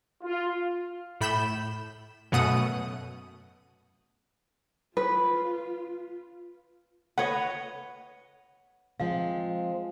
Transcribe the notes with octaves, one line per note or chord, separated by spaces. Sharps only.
F4
A2 B5 G6 E7
F#2 B2 A3 F#5 D#6
F4 B4
B4 C#5 D#5 F#5
F3 G#3 C4 F5